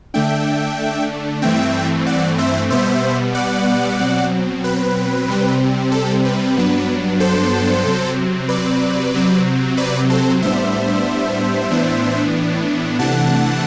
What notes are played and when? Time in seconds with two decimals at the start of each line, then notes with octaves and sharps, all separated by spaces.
0.14 D3 A3 D4 E5 G5
1.42 G2 E3 A3 C4 E5 G5
2.06 D5 F#5
2.38 C5 E5
2.70 B2 G3 B3 C5 E5
3.35 D5 F#5
4.00 B2 F#3 C4
4.64 B4
5.28 C3 G3 C4
5.92 A4
6.25 B4
6.57 G2 F#3 B3 D4
7.20 A4 C5
7.85 C3 F#3 C4
8.49 B4 D5
9.14 C3 F#3 C4
9.77 B4 D5
10.10 A4 C5
10.42 A2 G3 B3 D4 C5 E5
11.70 A2 E3 B3 D4
12.99 C3 E3 A3 D4 F#5 A5